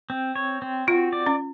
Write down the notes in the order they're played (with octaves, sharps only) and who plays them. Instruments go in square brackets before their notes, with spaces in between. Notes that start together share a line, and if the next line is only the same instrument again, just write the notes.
[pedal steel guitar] C4
C#5
C4
[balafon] F4 [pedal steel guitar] F#4
[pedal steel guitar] D5
[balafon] C#4